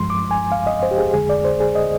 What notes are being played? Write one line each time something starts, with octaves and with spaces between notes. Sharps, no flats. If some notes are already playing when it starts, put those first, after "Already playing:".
Already playing: G2 F3 G#3 C6
D6
G#5
F5
D#5
C5
G4
G#4
F2 D3 G#3 G#4
D5
C5
G#4
D#5